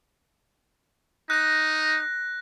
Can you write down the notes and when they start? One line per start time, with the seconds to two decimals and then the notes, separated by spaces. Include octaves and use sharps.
1.30 D#4 F#6 A#6